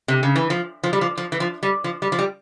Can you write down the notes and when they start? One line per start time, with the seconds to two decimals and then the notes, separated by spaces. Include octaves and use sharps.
0.08 C3
0.23 C#3
0.36 E3
0.50 F3
0.84 F3
0.93 G3
1.01 F3
1.18 F3
1.32 E3
1.40 F3
1.63 G3
1.84 F3
2.02 G3
2.12 F3
2.19 G3